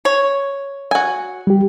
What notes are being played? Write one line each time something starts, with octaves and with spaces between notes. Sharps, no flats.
C#5
F#4 G#5
G3 G4